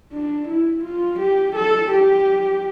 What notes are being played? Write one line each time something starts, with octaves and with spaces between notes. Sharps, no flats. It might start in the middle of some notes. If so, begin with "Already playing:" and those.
D4
E4
F4
G4
A4
G4